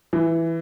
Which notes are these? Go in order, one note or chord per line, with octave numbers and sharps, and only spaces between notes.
E3